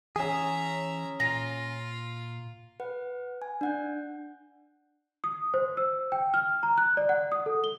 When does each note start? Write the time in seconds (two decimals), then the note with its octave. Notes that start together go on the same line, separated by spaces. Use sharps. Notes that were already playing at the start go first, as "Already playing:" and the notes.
0.16 E3 C#4 G#4 E5 A#5
1.20 A#2 F4 A#5
2.80 B4 F#5
3.42 G#5
3.61 D4 F#5 G6
5.24 D#6
5.54 C5
5.77 E6
6.12 G5
6.34 F6
6.63 A#5
6.78 F#6
6.97 D5
7.09 F#5
7.32 D#6
7.46 A4
7.64 G7